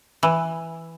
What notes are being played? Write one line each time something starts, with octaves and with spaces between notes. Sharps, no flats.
E3